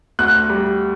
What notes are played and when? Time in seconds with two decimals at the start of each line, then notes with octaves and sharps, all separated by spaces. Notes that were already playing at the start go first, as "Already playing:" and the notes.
0.19 D2 F#6
0.50 G3